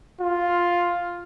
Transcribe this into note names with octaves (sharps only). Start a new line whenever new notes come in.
F4